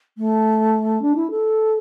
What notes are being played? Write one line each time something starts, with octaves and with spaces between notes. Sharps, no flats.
A3
D4
E4
A4